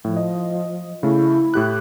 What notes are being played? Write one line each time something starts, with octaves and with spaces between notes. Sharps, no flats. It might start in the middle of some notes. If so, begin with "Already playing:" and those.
A2 F3
D#5
C#3 A3 E4
A2 G4 F#6